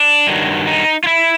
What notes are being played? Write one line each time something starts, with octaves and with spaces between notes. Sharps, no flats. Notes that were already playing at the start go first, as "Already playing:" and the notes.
Already playing: D4
G2 D#3 F#3
D#4
F4
E4